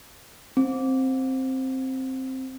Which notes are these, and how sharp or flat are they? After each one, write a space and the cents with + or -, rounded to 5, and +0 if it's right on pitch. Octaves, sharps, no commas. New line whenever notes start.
C4 +5